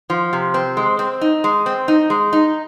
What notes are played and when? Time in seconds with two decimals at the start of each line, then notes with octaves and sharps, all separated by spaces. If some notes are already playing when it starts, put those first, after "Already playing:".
0.10 F3
0.33 C3
0.54 C4
0.77 G#3
0.99 C4
1.21 D#4
1.44 G#3
1.66 C4
1.88 D#4
2.10 G#3
2.33 D#4